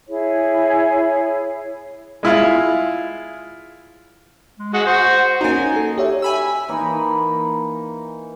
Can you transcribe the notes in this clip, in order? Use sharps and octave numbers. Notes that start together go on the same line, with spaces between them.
E4 G#4 C#5
G#3 E4 F4
G#3
G#3 F#4 F#5
F#4 C5
A#3 C#4 D#4 F#4 G#5
A4
G4 C#5 E5
G#5 B5 E6
E3 A#3 D#4